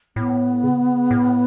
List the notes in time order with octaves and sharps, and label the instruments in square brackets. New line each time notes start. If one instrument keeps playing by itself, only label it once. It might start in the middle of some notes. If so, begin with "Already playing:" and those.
[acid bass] A2 [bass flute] B3
[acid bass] C#3
A2